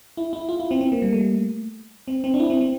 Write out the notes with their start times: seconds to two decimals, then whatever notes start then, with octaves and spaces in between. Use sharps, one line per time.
0.17 E4
0.33 E4
0.49 F4
0.60 E4
0.71 C4
0.81 C4
0.92 A#3
1.02 G3
1.13 A3
2.08 C4
2.24 C4
2.34 D4
2.40 E4
2.50 C4
2.61 C4